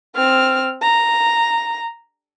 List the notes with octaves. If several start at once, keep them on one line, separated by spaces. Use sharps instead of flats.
C4 F6
A#5